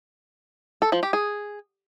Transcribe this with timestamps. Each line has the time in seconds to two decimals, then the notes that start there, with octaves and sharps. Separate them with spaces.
0.82 A4
0.92 F3
1.03 G4
1.13 G#4